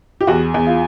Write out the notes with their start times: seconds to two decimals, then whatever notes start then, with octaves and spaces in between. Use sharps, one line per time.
0.21 G4
0.27 E2 F#4
0.54 E2
0.67 F4